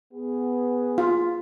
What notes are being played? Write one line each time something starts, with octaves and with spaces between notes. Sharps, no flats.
B3 G#4
F4 F5